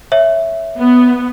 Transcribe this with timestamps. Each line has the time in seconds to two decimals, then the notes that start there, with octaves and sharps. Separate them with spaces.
0.12 C#5 E5
0.77 B3